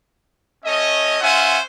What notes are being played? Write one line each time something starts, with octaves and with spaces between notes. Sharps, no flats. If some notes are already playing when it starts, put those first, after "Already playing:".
A3 C#4 C#5 D#5
C#4 F4 C5 E5 F#5 G#5